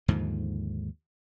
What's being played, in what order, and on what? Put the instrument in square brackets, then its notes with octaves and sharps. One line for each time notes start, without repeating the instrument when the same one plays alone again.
[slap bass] D#2 G#2 D3 F3